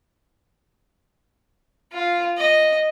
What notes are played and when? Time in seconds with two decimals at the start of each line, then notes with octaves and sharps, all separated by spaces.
1.92 F4
2.38 D#5